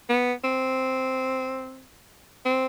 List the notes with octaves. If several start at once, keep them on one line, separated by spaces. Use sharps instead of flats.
B3
C4
C4